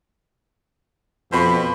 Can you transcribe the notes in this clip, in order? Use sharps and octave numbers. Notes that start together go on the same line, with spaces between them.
F2 B2 C5 B5 C#6